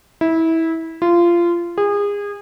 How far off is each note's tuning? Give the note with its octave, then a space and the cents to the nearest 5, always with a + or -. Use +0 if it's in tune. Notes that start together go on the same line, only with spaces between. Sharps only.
E4 -20
F4 -20
G#4 -30